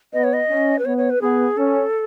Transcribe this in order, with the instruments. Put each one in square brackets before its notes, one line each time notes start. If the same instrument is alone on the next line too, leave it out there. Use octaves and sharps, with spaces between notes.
[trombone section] B3 [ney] D#5
[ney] C#5
D#5
[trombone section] C#4
[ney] B4
[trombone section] B3 [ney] C#5
[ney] C#5
B4
[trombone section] B3 [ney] G#4
[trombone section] C#4 [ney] A4